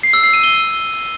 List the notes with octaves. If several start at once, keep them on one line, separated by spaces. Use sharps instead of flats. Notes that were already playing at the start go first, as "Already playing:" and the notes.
C7
E6
C7
D#7
G7